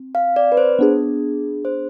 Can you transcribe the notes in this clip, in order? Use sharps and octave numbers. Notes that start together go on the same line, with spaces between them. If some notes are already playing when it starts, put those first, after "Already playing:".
Already playing: C4
F5
D5
B4
C5
B3 D4 G#4
C5